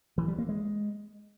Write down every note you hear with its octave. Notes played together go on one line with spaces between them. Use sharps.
E3
G3
A#3
G#3